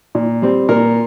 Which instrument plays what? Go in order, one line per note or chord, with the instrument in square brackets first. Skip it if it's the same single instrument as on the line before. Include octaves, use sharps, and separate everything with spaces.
[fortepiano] A#2
G3 C4
A#2 A#4